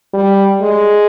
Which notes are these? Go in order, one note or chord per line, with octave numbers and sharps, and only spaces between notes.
G3
G#3